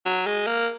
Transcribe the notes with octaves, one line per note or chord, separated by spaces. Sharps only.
F#3
G#3
A#3